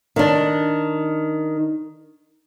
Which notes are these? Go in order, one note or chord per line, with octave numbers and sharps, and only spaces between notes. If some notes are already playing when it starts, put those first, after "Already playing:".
D#3 D4